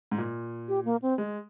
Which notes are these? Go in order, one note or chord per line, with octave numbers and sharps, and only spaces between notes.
G#2
A#2
G4
A#3
C4
G#3